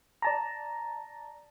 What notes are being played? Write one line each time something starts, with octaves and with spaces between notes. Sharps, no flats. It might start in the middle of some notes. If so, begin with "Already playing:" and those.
D5 A5 A#5